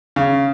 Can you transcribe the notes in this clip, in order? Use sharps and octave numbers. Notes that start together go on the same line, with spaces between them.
C#3